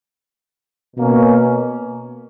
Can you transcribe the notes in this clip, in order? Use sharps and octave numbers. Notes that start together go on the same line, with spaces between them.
B2 A#3 C#4